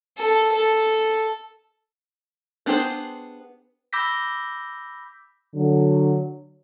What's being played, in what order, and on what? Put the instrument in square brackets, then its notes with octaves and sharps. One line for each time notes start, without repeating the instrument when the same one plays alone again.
[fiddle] A4
A4
[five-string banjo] B3 D4 G4 G#4 C5
[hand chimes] B5 D6 E6 G6 A#6 B6
[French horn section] D3 F#3